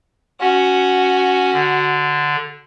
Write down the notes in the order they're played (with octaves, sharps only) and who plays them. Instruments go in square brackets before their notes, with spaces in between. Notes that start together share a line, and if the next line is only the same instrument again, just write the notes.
[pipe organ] C#4 [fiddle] F#4
[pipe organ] D3